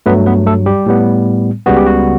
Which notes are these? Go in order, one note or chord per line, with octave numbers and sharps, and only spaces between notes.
G2 F#3 A3 B3 B4
B3 B4
A3 A4
G3 G4
A2 G3 B3
C#2 C#3 G3 B3 F#4
G4
F#4